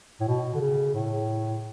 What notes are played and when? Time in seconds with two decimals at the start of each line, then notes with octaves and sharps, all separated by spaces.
0.20 A2
0.28 B2
0.55 D3
0.61 C#3
0.94 A2